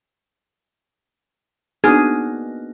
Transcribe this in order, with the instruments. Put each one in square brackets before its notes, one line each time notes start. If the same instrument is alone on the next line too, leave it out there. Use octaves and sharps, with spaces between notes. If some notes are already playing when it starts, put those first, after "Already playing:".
[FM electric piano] A#3 B3 D#4 [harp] D4 F#4 F6 [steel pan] G#4